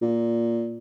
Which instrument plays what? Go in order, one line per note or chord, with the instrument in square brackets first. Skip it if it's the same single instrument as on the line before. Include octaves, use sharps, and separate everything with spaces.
[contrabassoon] A#2